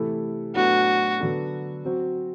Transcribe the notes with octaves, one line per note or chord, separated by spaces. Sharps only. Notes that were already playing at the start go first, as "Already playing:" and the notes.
Already playing: C3 E3 A3 E4 A4
A2 F#3 B3 D4 F#4 A4
D3 F#3 B3 D4 A4
F#3 C4 F#4